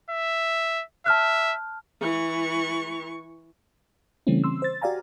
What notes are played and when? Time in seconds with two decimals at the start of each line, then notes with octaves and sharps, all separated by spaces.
0.10 E5
1.06 E5 A5 F6 F#6
2.01 E3 C#6
4.27 C#3 E3 G3 A3 C4 C#4
4.44 C6 E6
4.62 C5 A6
4.82 F#4 G4 D5 F5 G#5 A#5